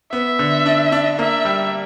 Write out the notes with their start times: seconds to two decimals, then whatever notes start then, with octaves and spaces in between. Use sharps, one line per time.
0.13 B3 E5
0.39 D3
0.66 D4
0.92 D4
1.19 A#3 E5
1.45 G3